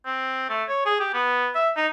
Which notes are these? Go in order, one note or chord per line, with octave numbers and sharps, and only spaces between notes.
C4
A3
C#5
G#4
G4
B3
E5
D#4